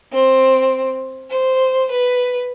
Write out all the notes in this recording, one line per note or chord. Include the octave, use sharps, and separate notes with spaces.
C4
C5
B4